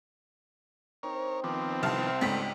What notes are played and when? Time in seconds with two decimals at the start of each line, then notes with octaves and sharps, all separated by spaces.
1.03 C4 D#4 A#4 C#5
1.44 D#3 F3 B3 C4 A#4 D6
1.83 C2 A5 F6
2.21 C#2 G#2 G3 A3 B3 B6